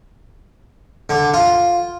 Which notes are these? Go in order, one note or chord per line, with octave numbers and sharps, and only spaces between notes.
D3
F4